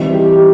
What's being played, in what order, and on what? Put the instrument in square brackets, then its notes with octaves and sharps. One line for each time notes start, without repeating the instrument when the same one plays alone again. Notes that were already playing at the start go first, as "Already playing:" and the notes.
Already playing: [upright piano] E3 G3 C4 D#4
[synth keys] G4